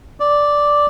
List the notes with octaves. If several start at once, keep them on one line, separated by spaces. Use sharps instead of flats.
D5